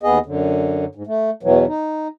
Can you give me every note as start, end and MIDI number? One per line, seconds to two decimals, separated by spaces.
0.03 0.19 39
0.03 0.19 59
0.03 0.19 68
0.03 0.19 75
0.26 0.85 42
0.26 0.85 50
0.95 1.03 44
1.07 1.30 57
1.43 1.65 40
1.43 1.65 47
1.43 1.65 52
1.43 1.65 54
1.67 2.08 63